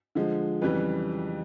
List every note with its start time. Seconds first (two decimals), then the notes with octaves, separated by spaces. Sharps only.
0.15 D3 F3 G#3
0.62 F2 C#3 E3 G3 B4